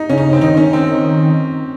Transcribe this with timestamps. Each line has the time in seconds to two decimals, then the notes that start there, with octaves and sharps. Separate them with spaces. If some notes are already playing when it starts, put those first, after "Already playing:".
Already playing: D#4
0.09 C#3 C#4
0.18 D#4
0.33 C4
0.41 D#3 D#4
0.57 C#4
0.73 D#3 C4